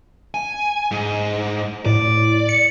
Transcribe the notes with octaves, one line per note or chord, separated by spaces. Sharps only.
G#5
G#2
A2 D5
C#7